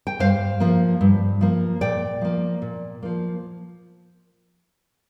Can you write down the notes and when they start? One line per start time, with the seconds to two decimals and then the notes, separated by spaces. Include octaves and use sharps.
0.07 G5
0.19 G2 C5 F5
0.60 F3 A#3
1.01 G2
1.41 F3 A#3
1.81 A#2 D5 G5
2.21 F3 A#3
2.62 A#2
3.03 F3 A#3